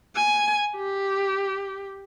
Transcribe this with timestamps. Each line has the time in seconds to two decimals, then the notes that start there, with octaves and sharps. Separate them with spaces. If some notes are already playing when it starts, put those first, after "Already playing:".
0.15 G#5
0.76 G4